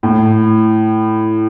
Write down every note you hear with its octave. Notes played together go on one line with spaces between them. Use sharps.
A2